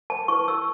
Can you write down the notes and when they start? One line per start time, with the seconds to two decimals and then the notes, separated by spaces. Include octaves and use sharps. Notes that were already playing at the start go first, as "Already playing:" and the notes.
0.10 A5
0.28 E4 B4 C#6
0.48 E6